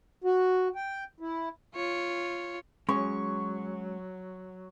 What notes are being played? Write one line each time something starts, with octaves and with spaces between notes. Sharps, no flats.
F#4
G5
E4
F4 C#5
F#3 G#3 C#4 C#6